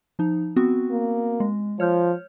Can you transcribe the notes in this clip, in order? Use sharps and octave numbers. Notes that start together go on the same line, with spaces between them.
F3 D#4
B3 C4 F#4
A#3
G#3
F3 C#5 F6 G6